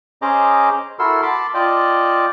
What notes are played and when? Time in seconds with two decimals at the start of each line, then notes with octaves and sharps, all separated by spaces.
0.22 C#4 G#4 C5 D#5 A#5 D6
0.99 E4 F#4 A4 A#4 C6 E6
1.22 A5 B5 C6 D6
1.54 F4 D5 D#5 G5 A5